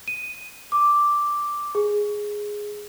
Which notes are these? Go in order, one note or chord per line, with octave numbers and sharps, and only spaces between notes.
D#7
D6
G#4